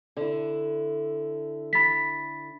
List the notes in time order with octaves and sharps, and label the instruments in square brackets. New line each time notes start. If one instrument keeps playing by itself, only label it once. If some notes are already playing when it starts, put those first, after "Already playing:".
[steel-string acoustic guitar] D3 E4
[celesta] B5 A6 B6